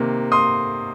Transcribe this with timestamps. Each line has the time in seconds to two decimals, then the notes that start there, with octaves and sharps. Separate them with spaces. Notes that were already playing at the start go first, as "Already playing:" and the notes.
Already playing: C3 D#3 A#3
0.32 C6 D#6